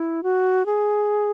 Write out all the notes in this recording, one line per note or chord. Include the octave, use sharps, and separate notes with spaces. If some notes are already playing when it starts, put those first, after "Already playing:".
Already playing: E4
F#4
G#4